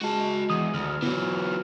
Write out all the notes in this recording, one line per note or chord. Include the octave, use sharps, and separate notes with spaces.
G#3 F#4 A5
E2 D#6
D2 F6
E3 F#3 B3